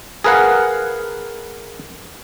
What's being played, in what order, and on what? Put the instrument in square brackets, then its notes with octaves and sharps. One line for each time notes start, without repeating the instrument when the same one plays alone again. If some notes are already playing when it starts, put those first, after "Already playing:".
[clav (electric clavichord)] G#4 A#4 B4 F5 F#5